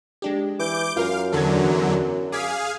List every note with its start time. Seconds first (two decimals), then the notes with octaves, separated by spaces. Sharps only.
0.22 G#3 D4 G4
0.59 E3 D6 G6 D7
0.97 F#2 F4 A#4 F5
1.33 E2 D3 F#3 A4 G#6
2.32 G#4 F5 D6 G#6 B6